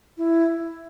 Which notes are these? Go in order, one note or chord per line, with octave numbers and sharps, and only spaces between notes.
E4